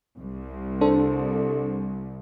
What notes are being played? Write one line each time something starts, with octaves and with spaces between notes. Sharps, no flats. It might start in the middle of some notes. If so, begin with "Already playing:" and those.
C2
D4 A4 C5